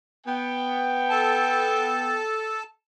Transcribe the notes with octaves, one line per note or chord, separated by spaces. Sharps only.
B3 G5
A4 A5